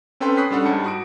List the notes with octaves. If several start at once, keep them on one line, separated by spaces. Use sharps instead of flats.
C4 C#4 A4 B4 G5 C6
B5 C#6 D#6 F#6 B6 C7
G3 C#4 D4 A4 F#5
G#2 G3 A5 C#7
F#4 D#6 D7